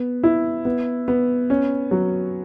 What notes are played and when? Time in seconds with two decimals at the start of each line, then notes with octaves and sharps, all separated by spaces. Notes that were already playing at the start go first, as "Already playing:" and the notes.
Already playing: B3
0.23 E4
0.65 B3
1.08 B3
1.50 C#4
1.91 F#3